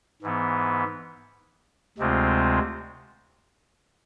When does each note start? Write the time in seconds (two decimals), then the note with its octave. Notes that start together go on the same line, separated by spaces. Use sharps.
0.22 G#2 E3 B3
1.98 D2 C3 G#3 C4 F4